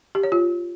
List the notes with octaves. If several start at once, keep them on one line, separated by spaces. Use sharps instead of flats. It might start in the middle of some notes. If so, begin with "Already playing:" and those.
G4
C#5
F4